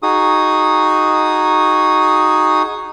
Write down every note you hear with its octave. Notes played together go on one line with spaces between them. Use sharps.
D#4 F#4 G#4 D#6